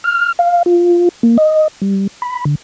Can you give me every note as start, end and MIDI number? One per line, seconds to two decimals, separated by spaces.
0.04 0.32 89
0.39 0.63 77
0.66 1.09 65
1.23 1.37 58
1.38 1.68 75
1.82 2.07 55
2.22 2.44 83
2.45 2.55 50